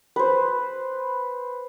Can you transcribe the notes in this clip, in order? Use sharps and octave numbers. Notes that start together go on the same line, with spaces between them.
B4 C5